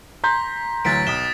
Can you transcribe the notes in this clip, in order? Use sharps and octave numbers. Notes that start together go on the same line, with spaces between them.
A#5 C6 G6 B6
D2 E3 F#3 A6 B6 D7
B1 D#6 B6 E7 G7